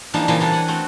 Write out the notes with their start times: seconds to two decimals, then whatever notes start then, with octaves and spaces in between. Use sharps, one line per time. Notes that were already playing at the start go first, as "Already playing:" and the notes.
0.14 E3 F3 G3 A#3 D4 D#4
0.28 A#2 C#3 E3 F3 A#3
0.40 E3 G3 D4 A4
0.53 F#5 G#5
0.68 A3 C4 F#4